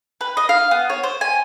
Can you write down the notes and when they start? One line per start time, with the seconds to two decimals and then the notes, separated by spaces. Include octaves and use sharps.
0.21 B4
0.37 D#5
0.49 F5
0.71 B3
0.90 C#5
1.04 C5
1.21 G#5